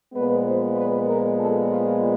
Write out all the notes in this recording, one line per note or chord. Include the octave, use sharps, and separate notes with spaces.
A#2 F3 G#3 B3 B4
C5
B4
A#4
A4
F4